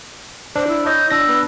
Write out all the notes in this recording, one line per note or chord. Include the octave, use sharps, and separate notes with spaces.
D4 C5
E4
C#5 D#5 G6
D4 E6 A#6
B3